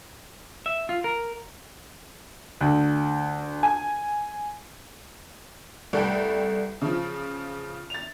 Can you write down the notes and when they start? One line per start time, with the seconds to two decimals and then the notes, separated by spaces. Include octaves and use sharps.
0.66 E5
0.89 F4
1.04 A#4
2.61 D2
3.63 G#5
5.93 C2 A3 A4 B4 G5
6.82 C#3 F3
7.90 A6 F7